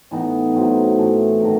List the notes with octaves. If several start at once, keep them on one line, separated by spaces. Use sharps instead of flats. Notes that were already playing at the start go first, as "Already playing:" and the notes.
A2 E3 B3 D#4
A2 F#3 C4
A2 E3 A3
C3 D#3 F#3 A3